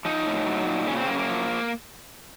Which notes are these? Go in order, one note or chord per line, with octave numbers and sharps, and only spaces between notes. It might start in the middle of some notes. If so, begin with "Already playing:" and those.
F3 D#4
A2
F#3
A#2
C#3 C#4
C4
F#2 A#3
A#3
F3